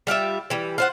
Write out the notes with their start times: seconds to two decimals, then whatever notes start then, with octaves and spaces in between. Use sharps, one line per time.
0.07 G3 F4 G4 E5
0.50 E3 G3
0.78 F4 C5 F#5